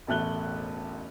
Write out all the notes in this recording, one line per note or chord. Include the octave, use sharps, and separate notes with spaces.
E1 A1 A3 F#6 G7